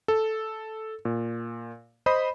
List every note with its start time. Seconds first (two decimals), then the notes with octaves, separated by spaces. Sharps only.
0.08 A4
1.05 A#2
2.06 C5 D#5 B5 D#6